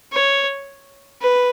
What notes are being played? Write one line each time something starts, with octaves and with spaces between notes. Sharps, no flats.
C#5
B4